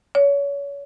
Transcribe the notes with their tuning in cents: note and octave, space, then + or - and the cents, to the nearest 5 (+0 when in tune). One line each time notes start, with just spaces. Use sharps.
C#5 +30